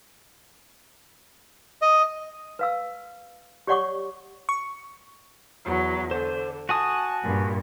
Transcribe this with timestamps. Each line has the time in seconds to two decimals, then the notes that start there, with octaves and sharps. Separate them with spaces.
1.82 D#5
2.59 B4 F5 E6
3.67 G4 C#5 D5 F#5 C#6 D6
4.49 C#6
5.64 E2 F#3
6.11 D3 C5
6.69 F#4 G#5 A5 D#6
7.24 G2 A#2